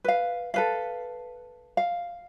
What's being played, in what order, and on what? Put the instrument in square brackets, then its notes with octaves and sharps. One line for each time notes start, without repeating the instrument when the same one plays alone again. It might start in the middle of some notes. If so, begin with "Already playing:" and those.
[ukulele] B4 F5
A4 B4 F5
F5